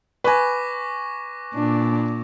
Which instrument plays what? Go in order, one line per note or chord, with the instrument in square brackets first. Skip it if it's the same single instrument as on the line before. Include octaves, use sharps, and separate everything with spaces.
[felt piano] B4 G#5 [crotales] C#6 D6 A#6
[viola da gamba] A#2 [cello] D4